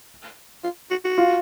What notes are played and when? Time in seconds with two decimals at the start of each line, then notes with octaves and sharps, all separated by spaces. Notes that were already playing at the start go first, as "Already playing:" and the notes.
0.64 F4
0.91 F#4
1.05 F#4
1.18 F4